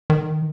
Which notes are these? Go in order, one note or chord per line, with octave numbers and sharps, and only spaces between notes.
D#3